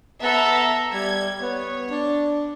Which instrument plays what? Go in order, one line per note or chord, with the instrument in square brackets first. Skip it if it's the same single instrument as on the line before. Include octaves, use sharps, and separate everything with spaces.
[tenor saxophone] B3 [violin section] A4 E5 A#5
[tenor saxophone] G3 [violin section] G#6
[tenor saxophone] B3 [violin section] C#5
[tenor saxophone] D4